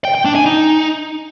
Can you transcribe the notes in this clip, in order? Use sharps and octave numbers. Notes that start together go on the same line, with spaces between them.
G5
G5
D4
G#5
D#4